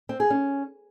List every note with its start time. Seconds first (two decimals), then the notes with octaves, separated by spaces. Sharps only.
0.09 C4
0.20 G#4
0.30 C#4